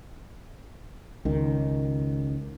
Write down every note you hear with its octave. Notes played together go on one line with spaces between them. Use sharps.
C#2 D#3